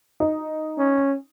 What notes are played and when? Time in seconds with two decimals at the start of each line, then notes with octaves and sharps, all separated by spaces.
0.20 D#4
0.78 C#4